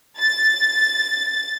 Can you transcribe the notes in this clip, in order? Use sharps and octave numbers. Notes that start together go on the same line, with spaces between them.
A6